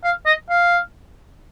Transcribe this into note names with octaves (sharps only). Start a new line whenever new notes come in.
F5
D#5
F5